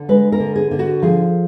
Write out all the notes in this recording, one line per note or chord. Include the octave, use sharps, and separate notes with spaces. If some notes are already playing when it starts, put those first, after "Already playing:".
Already playing: D3
G#3 B4
A#4
D3
G#4
D3
F#4
F3 G#4